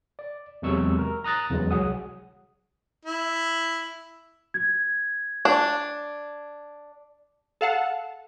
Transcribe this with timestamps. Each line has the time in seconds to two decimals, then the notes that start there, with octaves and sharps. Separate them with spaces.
0.19 D5
0.62 E2 C3 F#3 G#3 C#6 E6
0.99 A#4
1.24 A#5 D#6 F#6 A6 A#6
1.50 E2 C#3 E3 F#3 G#3
1.71 C2 F#3 G#4 F#5 D#6
3.05 E4
4.54 G#6
5.45 D4
7.61 A4 F5 F#5 A5